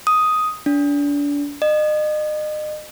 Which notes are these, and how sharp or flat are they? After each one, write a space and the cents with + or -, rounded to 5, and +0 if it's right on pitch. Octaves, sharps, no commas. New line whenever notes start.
D#6 +5
D4 -35
D#5 -35